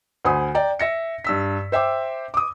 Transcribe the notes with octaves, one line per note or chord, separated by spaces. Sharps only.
D2 C5 G#5 B5 D#6
D5 G5 A#5
E5 A#6 C#7
G2 E6 B6
C5 E5 G5 D6
D6 D#6